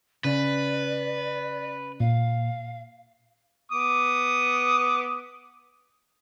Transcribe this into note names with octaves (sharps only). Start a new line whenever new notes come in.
C#3 B4 D5
A#2 F5
B3 D6 D#6